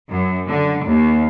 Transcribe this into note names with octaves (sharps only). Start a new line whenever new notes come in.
F#2
D3
D#2